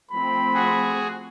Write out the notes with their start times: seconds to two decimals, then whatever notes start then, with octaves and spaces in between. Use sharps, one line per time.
0.11 F3 A3 C4 B5
0.54 F#4 G#4